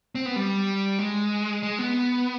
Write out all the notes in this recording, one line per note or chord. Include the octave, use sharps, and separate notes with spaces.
C4
B3
G3
G#3
G#3
B3